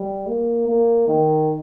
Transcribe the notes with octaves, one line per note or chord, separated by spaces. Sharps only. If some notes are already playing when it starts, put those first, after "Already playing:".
Already playing: G3
A#3
A#3
D#3